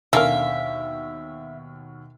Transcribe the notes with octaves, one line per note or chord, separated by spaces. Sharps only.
D#2 B2 D3 C#4 A#4 E5 F5